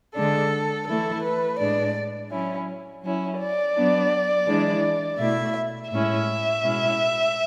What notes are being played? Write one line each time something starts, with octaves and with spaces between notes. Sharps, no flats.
D3 G#3 D4 A4
E3 A3 E4 A4
B4
A2 G#3 D4 D5
F#3 C#4 E4
F#3 C#4 E4
D5
F#3 B3 D4
E3 G#3 D4
B2 A3 E4 E5
A2 G#3 C#4 E4 E5
B2 G#3 C#4 E4